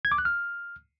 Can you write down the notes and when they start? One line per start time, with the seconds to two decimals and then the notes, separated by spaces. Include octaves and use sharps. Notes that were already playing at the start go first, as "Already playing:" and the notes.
0.05 G#6
0.12 D6
0.18 F#6
0.25 F6